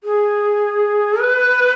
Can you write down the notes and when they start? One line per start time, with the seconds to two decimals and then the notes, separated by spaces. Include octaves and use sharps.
0.04 G#4
1.20 B4